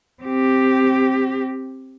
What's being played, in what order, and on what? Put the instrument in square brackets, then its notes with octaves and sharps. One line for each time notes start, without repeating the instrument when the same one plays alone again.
[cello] C4 G4